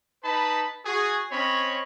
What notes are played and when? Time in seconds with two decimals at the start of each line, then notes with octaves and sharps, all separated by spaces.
0.23 D#4 B4 A5 B5
0.84 F#4 G#4
1.31 C4 C#4 C#5 D#5 B5